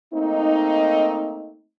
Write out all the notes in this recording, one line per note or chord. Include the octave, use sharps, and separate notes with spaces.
A3 A#3 C4 D#4